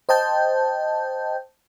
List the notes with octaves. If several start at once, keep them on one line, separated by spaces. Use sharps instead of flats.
C5 D#5 G5 A5 G6